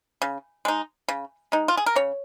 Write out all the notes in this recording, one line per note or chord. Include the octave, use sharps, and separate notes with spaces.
C#3
G#3 D#4
C#3
G#3 D#4
F4
G#4
A#4
C#3 C#5